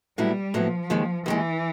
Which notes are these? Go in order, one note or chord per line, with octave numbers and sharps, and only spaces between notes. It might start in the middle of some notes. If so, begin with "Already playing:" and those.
A2 F#3 G3 B3 E4
A2 F3 F#3 B3 E4
D#2 D#3 G#3
D#2 D#3 E3 G#3